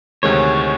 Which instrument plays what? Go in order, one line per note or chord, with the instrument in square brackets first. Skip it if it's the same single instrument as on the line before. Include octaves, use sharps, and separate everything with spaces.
[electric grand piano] D2 C3 D#3 G#3 [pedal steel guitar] C#5